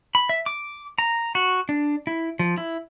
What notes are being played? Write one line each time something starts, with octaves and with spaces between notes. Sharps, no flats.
B5
E5
D6
A#5
F#4
D4
E4
F3
E4